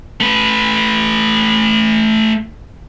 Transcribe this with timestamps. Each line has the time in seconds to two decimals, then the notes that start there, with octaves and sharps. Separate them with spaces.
0.20 A3 B4